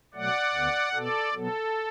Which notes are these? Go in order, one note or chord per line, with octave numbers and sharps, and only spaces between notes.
B2 F#3 A3 D5 F#5
D2 D3 B3
B2 B3 A4 D5
B2 F#3 B3 A4